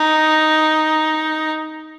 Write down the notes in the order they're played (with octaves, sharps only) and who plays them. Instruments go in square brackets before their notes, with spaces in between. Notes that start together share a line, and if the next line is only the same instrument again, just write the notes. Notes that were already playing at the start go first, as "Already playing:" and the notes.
Already playing: [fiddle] D#4